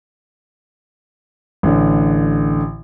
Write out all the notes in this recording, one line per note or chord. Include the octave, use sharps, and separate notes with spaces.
A1 D3